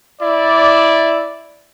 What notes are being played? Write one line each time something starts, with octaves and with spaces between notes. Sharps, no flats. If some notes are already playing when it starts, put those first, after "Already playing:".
E4 D5